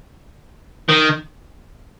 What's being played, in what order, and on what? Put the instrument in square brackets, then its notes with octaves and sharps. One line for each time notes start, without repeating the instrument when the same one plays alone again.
[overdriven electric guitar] D#3